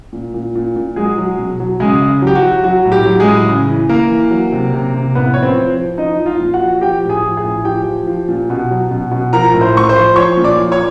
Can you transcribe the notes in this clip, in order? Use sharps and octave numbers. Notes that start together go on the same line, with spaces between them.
A#2
A#2
A#2
A#2
F#3 G#3 G#4
F#3
B2
F#3
C#3 G#3 G#4
C#3
F#3 G4
F#4
F#3
F#3 F#4
A2
G4
F#3
G#3 G#4
A2
C#3
E3
E3 A#3 A#4
E3
F#3
C3
C3
C3
A2 B3 B4
F3 C#5
C4 C5
F3
F3
F3 D#4 D#5
F3
F4 F5
A#2
F#4 F#5
F3
F3 G4 G5
A2
G#4 G#5
F3
G#4 G#5
A2
F3 G4 G5
F3
F3
A#2
B2
F#3
B2
B2
F3 A#4 A#5
A2
C5 C6
A2 C#6
C5 C6
F3
F3 C#5 C#6
A#2
D5 D6
F3
C#5 C#6